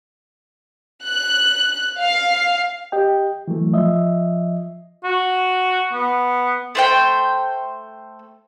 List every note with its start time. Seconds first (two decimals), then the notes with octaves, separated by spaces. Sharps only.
1.04 F#6
2.01 F5
2.92 G4 D#5 G5
3.48 E3 F#3 A3
3.73 F3 D#5 E5
5.04 F#4
5.93 B3
6.75 A3 C5 G5